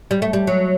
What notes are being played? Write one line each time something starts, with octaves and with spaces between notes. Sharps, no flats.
G3
A3
G3
F#3